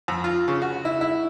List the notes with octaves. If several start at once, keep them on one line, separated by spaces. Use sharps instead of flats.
F2
F4
C#3
F#4
E4
E4